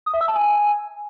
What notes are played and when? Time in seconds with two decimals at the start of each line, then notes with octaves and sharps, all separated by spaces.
0.06 D#6
0.14 E5
0.21 E6
0.28 A5
0.35 G#5